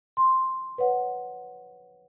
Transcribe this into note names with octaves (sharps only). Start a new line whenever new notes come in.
C6
B4 C#5 F#5